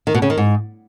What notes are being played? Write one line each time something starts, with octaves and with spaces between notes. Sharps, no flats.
D#3
B2
C#3
D#3
G#2